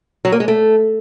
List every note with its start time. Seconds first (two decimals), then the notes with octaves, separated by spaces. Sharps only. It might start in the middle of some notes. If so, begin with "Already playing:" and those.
0.25 F#3
0.32 A#3
0.40 G#3
0.48 A3